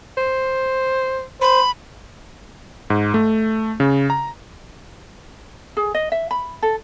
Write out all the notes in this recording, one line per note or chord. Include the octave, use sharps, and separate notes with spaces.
C5
C5 B5
G#2
A3
C#3
A#5
G#4
D#5
E5
B5
A4